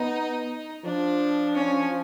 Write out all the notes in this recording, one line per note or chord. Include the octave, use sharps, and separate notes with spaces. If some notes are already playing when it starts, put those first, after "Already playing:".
Already playing: B3 D#4
F3 D4
C#4